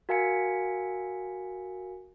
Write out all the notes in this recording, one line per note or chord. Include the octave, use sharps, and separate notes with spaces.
F#4 A#4 F5 G#5 B6 C#7